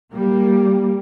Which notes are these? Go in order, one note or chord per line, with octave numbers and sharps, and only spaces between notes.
G3 A#3